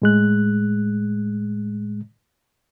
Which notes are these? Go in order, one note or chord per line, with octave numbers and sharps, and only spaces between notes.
A2 G#3 F#6